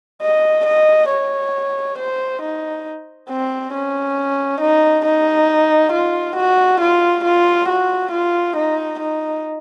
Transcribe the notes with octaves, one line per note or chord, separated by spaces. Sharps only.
D#5
D#5
C#5
C5
D#4
C4
C#4
D#4
D#4
F4
F#4
F4
F4
F#4
F4
D#4
D#4